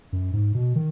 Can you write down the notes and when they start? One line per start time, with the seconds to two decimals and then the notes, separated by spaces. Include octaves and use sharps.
0.12 F#2
0.33 G#2
0.55 B2
0.75 D#3